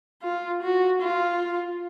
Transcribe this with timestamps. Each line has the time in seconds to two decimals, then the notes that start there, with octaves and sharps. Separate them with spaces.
0.23 F4
0.63 F#4
1.02 F4